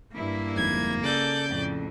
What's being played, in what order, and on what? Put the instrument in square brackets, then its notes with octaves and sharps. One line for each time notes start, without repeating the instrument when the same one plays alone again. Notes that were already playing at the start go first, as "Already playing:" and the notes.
[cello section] G2 E4 [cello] A#3
[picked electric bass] G1 F2 G#2 [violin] G#6
[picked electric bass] C#3 [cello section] A4 [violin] D5 G6
[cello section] F2 A2